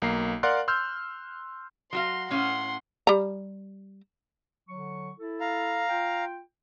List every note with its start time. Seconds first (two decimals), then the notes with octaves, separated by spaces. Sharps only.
0.02 B1 A#3 A#5 C7
0.43 A#4 D5 F5 F#5 C6 F#6
0.68 C6 E6 F6 G6
1.93 F#3 F#4 F5 C6
2.31 A2 C#4 F5 F#5 C6
3.07 G3 A#5
4.68 D3 F#3 C#6
5.19 E4 A4
5.40 F5 A#5
5.89 F4 G5